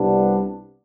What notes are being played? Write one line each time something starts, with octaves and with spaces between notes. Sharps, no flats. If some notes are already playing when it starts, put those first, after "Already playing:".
Already playing: C2 C3 G3 B3 D4